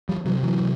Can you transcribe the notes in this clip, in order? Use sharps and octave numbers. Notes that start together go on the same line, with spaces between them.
F3 G3
C3 E3 F#3
E3 F#3
C3